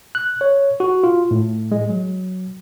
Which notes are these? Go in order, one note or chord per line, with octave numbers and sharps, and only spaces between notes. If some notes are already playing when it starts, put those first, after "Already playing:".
F#6
C#5
F#4
F4
A2
G#3
F#3